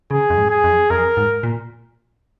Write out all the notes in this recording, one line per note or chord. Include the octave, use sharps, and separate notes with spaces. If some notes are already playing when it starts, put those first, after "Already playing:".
C#3 G#4
F2
G#2
G#4
F2
F2 A#4
G#2
A#2